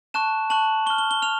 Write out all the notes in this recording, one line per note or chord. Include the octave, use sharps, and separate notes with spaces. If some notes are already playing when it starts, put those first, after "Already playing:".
A5 C#6 F#6 E7
A5 C#6 F#6 F#7
C#6 F6 G7
G7
G7
F6 F7